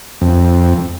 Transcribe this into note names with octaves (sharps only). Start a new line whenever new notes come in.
F2